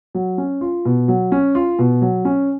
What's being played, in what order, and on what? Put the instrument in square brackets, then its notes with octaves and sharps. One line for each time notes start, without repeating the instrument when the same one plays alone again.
[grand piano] F#3
C#4
F4
B2
F#3
C#4
F4
B2
F#3
C#4